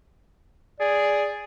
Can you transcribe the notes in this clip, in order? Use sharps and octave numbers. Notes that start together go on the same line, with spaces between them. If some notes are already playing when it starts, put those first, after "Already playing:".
G#4 D5